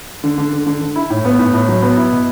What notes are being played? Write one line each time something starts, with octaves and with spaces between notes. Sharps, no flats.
D3
D3
D3
D3
D3
E4
A2
B3
A2
A2
F#3
B3
E4
B2